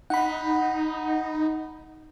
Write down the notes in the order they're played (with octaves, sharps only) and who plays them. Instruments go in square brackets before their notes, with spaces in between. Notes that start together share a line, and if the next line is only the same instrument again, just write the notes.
[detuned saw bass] D#4 [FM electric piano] F#5 B5